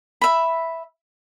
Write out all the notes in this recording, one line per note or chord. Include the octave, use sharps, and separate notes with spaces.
E5 B5